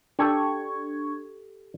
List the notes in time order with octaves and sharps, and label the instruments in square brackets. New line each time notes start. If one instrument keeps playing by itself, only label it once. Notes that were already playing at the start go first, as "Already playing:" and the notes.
[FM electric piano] D4 C#6 G#6 [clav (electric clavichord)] G4 A4